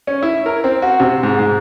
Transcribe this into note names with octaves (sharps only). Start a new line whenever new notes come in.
C#4
E4
A#4
C4
F#4
C3
G#2
G#2